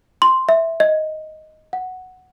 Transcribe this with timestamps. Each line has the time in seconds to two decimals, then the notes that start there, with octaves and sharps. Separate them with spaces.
0.22 C6
0.49 E5
0.80 D#5
1.73 F#5